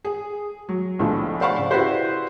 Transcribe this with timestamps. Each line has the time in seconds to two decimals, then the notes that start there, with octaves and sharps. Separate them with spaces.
0.05 G#4
0.69 F#3
0.99 B1 A2 D3 F3
1.41 C5 D5 F5 F#5 B5 C#6
1.58 C#3
1.70 E4 F#4 G4 B4 C5 D5